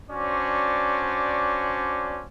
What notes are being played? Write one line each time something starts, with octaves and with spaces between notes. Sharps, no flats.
C#4 D4 F#4 C5 D5